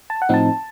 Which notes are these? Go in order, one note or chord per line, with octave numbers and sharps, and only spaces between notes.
A5
F#5
A2 F3 C4 D#4 A5